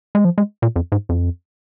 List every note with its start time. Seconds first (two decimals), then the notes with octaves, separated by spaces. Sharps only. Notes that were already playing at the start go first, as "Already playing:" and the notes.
0.15 G#3
0.25 F3
0.38 G#3
0.62 A#2
0.76 F2
0.92 G#2
1.09 F2